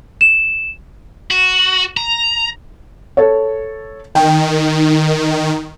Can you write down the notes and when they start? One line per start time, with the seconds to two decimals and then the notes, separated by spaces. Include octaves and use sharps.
0.21 E7
1.31 F#4
1.97 A#5
3.17 A4 C#5
4.15 D#3 G5